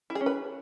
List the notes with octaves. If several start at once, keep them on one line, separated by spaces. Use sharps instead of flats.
E4
G#4
C#4
B4